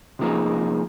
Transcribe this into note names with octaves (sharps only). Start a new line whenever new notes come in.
C3 F3 A#3 D#4 G#4